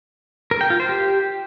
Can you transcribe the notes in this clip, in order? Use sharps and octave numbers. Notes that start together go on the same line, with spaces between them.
A#4
G5
F4
C5
G4